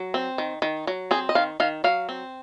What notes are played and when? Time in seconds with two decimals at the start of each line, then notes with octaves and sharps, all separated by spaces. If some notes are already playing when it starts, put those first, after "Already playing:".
Already playing: F#3
0.14 C4
0.38 D#3
0.62 D#3
0.87 F#3
1.11 C4 G#4
1.29 D#5
1.35 D#3 F5
1.60 D#3 F5
1.84 F#3 F5
2.09 C4